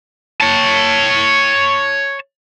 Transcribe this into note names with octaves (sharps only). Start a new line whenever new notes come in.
C#5 A5